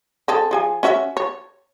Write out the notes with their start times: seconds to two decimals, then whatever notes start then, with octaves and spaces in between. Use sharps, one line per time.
0.28 C4 G#4 A4
0.51 F3 G#4 G#5
0.83 C#4 F#4 E5
1.17 C#5